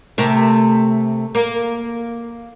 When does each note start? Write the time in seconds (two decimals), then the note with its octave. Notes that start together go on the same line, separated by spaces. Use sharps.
0.18 C3 A3 A#4
1.35 A#3